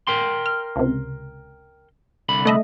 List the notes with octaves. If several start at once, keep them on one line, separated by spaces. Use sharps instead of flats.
A#4 G5 C6
F6
C#2 C3
C2 D3 B5
A3 D#5 E5